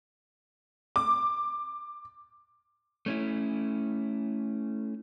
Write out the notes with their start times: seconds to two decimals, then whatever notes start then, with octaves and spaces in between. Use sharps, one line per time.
0.96 D6
3.06 A3 C#4 E4